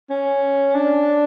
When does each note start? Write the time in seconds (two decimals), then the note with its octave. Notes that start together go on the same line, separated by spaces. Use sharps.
0.10 C#4
0.75 D4